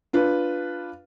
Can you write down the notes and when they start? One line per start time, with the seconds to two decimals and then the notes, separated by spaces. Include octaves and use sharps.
0.13 D4 F4 B4